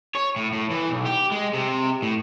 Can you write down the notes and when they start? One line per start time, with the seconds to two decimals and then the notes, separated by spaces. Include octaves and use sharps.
0.15 C#5
0.36 A2
0.53 A2
0.71 E3
0.91 B1
1.06 G4
1.32 G#3
1.54 C3
2.02 A2